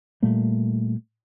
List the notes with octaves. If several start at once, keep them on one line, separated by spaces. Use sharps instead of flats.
A#2 G3 A3 A#3